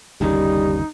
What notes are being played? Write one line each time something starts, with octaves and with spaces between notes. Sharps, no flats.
G1 D#2 C#3 G3 D#4